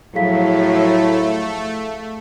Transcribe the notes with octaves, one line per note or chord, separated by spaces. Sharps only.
A2 F3 F#3 A3 G#4 F5 B6